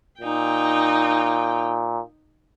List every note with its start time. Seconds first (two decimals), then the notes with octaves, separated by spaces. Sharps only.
0.21 A#2 D#4 G5